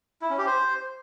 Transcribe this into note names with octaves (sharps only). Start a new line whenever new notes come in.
E4
C#4
G4
C5